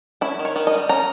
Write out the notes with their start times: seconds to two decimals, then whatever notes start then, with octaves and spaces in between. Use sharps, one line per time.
0.21 C#4 E4
0.39 D#3
0.45 C#5
0.56 D#3
0.67 D#5
0.73 G3
0.89 C#4 A#5